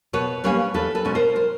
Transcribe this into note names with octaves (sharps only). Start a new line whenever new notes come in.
B2 B4 C#5
G3 A#3 C#4 B4 C#5
E2 A4 B4
A4 B4
B2 G#3 C#4
A#4 C5
A#4 C5